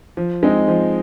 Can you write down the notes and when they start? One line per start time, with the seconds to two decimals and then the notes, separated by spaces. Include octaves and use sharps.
0.17 F3
0.43 G#3 C4 D#4
0.68 F3